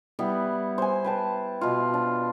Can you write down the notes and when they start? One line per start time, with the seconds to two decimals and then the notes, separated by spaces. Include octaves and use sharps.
0.19 G3 B3 E4
0.78 C5 G#5
1.04 B4 G5 A5
1.61 B2 F4
1.94 D4